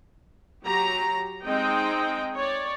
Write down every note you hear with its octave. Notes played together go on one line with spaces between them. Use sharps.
F#3 G4 A#5
G#3 C4 D#4 D#5 G5
C#5 D5